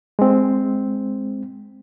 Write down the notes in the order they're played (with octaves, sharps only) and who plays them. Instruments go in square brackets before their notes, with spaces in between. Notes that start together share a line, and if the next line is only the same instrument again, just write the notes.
[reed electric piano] G#3 C4